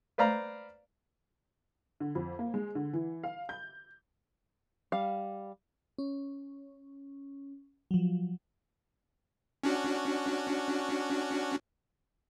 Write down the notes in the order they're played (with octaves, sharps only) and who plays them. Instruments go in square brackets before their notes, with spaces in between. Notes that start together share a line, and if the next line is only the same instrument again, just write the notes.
[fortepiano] B4 C5 D5 F5 A#5
[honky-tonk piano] D3
F2
A#3
G#3
D3
E3
F5
G6
[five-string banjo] G3 F5
[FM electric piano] C#4
F3 F#3
[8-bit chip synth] C#4 D4 F#4